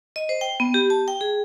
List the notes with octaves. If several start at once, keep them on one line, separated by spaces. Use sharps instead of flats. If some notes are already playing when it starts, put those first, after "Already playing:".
D#5
C5
G5
B3
G4
A5
G5
G#4